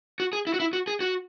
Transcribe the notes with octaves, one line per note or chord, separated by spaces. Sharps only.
F#4
G#4
E4
F#4
E4
F#4
G#4
F#4